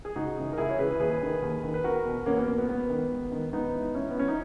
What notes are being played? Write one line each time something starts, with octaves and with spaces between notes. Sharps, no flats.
G#4
C#2 D#4 F#4
C#3 E3
A#4
C#2 E4 G#4
C#5
C#3 E3 G#4 B4
D#2 G#4 B4
D#3
D#2
D#3
B4
E2 F#4 A#4
B2
E2 A#3 C#4
B3
B2 A#3
B3
G#2 B3
D#3
G#2
D#3
G#2 B3 D#4
E3
G#2 C#4 E4
B3
E3 C#4
D#4